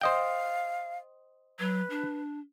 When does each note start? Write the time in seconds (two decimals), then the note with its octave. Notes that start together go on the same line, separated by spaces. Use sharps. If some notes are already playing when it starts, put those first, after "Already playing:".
0.01 C5 D#5 F5 G5
1.60 F#3 B4
1.90 D4